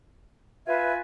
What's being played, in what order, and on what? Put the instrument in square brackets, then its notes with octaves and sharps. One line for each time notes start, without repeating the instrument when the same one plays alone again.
[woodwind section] F4 G#5 [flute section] B4 E5